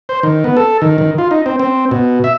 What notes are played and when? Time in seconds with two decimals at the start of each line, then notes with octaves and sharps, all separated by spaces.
0.09 C5
0.23 D#3
0.44 B3
0.57 A4
0.82 D#3
0.98 D#3
1.18 F4
1.31 D#4
1.46 C4
1.59 C4
1.91 B2
2.24 E5